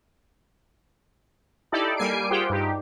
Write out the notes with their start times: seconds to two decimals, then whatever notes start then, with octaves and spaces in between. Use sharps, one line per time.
1.72 D#4 E4 G4 A4 D5
1.97 G3 A#3 G#5 C7 D7
2.30 F4 G4 G#4 C5 F#5 G5
2.50 G2 D#4 G4